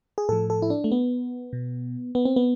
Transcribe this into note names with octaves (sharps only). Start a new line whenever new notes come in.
G#4
A2 F3 A4
A4
E4
D4
A3
B3
B2
B3
C4
B3